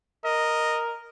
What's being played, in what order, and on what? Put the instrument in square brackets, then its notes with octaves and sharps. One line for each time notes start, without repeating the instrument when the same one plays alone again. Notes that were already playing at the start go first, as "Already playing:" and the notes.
[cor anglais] A#4 [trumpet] D#5